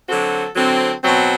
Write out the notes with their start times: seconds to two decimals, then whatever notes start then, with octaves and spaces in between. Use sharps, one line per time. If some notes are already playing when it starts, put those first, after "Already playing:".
0.08 D3 F#3 C4 F#4 A4
0.55 D3 F#3 C4
1.01 B2 F#3 C4